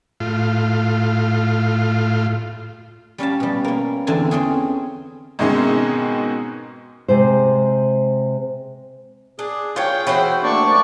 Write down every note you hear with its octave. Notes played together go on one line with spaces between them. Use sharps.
A2 F4
G3 C#4 F5 A5
B2 G3
A#3 C#4
E2 D3 C4 G#5 A5
C4 C#4 G#4
G#2 B2 D#3 G#3 C4 C#4
C3 G#3 C5
D4 G#4
F4 C#5 G5
E3 F#4 C5
A3 A#3 D4 D5 C#6